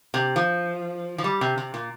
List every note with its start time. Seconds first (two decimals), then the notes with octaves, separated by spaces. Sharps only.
0.14 C3
0.36 F3
1.18 F3
1.24 G3
1.41 C3
1.58 C3
1.74 A#2